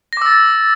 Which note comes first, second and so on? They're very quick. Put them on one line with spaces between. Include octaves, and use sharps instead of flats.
A#6 D6 E6 A6